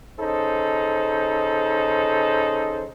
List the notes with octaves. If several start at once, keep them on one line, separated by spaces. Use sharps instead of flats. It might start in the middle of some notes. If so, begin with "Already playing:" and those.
C#3 D#4 A4 C5